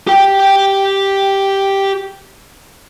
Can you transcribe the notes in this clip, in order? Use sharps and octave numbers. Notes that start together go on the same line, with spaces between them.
G4 G5